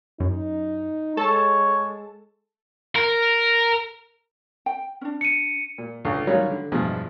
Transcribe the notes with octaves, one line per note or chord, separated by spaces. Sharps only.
F#2 D#4
G#3 A4 C#5 A5
A#4
G5
C#4 D4
C#7 D#7
A#2
C#2 D3
D#3 F#3 G3 C#4 F4 C#5
D3
E2 G2 B2 F3 G#3 D4